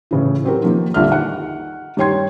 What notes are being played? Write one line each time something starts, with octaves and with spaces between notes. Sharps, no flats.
A2 C#3 E3
F#3 C4 G4 A#4
D#3 F3 A#3
A#1 D3 G3 E5 F6
D#3 F#5
G2 D#3 C#5 G5 C6 G#6